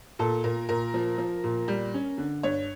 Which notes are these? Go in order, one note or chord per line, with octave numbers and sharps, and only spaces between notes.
A#2 A4
A#2 A#4
A#2 A#4
F3
F3
A#2
G3
C#4
D3
G2 C#5